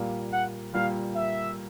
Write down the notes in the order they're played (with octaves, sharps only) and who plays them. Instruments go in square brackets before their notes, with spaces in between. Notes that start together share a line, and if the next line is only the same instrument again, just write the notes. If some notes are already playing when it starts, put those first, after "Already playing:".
Already playing: [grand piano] A#2 G3 A#3
[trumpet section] F#5
[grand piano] A#2 G3 A#3 [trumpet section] F5
[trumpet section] E5